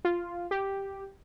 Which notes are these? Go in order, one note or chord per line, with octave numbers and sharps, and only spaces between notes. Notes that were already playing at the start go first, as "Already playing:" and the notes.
F4
G4